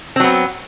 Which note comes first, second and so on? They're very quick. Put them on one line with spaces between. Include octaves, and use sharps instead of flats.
C4 F#3 B3